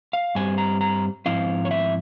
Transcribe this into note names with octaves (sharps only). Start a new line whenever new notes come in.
F5
G2 G3 C4 G#5
A#5
A#5
G#2 F3 C4 E4 F5
C#5
E5